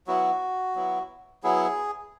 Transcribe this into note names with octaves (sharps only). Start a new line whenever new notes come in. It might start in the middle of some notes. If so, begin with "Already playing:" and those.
F#3 B3 E4 F#4
F#3 B3 E4
F#3 B3 E4 G#4